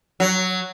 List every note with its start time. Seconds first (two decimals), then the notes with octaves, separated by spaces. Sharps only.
0.20 F#3